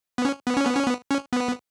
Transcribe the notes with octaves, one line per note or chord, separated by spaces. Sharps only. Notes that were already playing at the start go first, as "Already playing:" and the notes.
B3
C#4
B3
C#4
B3
C#4
B3
C#4
B3